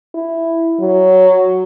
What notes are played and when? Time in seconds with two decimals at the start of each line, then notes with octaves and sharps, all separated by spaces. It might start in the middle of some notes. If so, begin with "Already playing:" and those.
0.15 E4
0.80 F#3